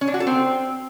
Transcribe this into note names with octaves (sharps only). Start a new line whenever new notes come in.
C#4
D4
F#4
A4
C4